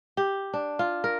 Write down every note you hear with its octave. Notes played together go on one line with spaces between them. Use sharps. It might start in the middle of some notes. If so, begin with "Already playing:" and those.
G4
D4
F4
A#4